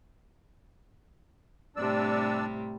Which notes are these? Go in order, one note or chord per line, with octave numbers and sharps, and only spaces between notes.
A2 C3 G3 D4 D5 E6